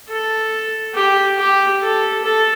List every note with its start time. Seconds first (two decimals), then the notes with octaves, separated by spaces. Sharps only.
0.09 A4
0.95 G4
1.38 G4
1.82 A4
2.24 A4